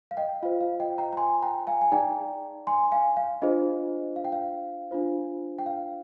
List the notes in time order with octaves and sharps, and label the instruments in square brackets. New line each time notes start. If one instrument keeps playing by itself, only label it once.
[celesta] F5
D#5 G5
F4 C5 F5
F5
D#5 G5
G5 A#5
A#5
G#5 C6
G5 A#5
F5 G#5
G#5
D#4 G#4 D5 G5 A#5
G#5 C6
F5 G#5
F5
D4 F4 G#4 C5 D#5
F5
G5
F5
D4 F4 C5
G5
F5